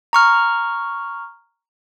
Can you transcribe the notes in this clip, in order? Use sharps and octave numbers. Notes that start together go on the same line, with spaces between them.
A#5 C#6 F6